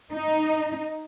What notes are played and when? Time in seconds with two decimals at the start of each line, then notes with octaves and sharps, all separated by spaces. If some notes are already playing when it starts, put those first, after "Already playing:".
0.13 D#4